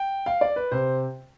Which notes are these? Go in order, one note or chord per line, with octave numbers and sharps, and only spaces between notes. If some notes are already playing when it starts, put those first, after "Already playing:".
Already playing: G5
F5
D5
B4
C3 C5